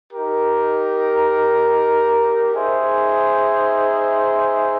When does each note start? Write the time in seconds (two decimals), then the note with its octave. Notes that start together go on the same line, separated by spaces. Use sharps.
0.13 D#4 G4 A#4
2.53 D#4 G#4 C5 E5